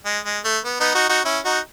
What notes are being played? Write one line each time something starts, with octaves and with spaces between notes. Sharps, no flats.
G#3
G#3
A3
B3
B3 D#4
D#4 F#4
D#4 F#4
C#4 E4
D#4 F#4